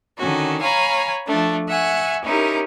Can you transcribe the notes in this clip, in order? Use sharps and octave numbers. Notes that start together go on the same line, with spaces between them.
D3 D#3 C#4 F#4
C#5 F5 G#5 A#5 B5
F3 A3 D4
E5 F#5 G#5 C#6
C#4 D#4 E4 G4 A#4